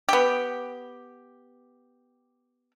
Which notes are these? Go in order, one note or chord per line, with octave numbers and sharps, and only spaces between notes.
B3 G4